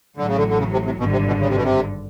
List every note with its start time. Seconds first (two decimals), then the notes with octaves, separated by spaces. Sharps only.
0.17 A1 A2 D3 F#3
0.27 C#3
0.37 D3
0.49 D3
0.59 C#3
0.72 C3
0.85 C3
0.99 G#1 G2 B2 D3
1.12 C3
1.27 B2
1.40 C#3
1.48 C3
1.56 B2
1.63 C3